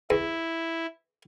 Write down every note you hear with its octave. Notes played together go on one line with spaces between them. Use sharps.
E2 E4